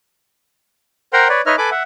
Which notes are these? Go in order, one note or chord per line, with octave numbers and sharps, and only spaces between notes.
A#4 C5 F#5 G5 A#5 C6
B4 C#5 D5
D#4 B4 C#5 D#5 E5 F6
A4 B4 G#5 B5 D6
E5 F#5